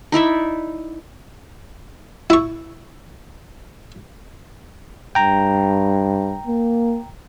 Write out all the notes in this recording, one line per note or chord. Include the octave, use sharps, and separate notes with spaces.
D#4 E4 D5 E5
E4 C#6
G2 G5 A#5
A#3